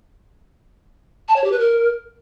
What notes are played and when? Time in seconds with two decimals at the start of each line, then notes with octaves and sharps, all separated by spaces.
1.28 A5
1.36 C#5
1.44 G4
1.52 B4
1.59 A#4